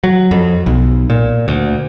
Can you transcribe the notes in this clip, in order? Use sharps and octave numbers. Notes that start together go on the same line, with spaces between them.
F#3
F2
B1
A#2
D2